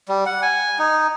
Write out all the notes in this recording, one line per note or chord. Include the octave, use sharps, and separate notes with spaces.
G3
F#5
G#5
D#4